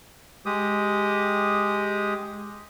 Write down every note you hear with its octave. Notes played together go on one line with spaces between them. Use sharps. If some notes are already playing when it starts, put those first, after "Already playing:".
G#3 G4 D#6